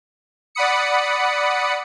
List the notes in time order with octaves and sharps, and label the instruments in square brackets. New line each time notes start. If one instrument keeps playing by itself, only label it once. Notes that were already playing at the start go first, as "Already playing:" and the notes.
[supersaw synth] D5 F#5 B5 D#6 C#7